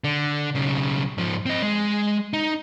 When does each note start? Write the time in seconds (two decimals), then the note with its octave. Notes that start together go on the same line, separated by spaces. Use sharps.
0.04 D3
0.55 B1 C#3
1.18 G#2 F3
1.46 C4 D#5
1.63 G#3
2.33 D#4